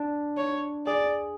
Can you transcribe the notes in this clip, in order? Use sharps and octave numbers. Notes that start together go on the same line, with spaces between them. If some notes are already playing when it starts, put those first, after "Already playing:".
Already playing: D4
C#5
G#4 D5